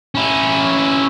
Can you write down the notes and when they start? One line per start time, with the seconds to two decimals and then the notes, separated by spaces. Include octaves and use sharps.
0.15 C#4 E4